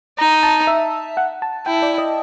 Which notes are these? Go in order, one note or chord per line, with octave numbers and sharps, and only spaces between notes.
D#4 A#5
A5
E5
F#5
A5
E4 G5
D5
D#5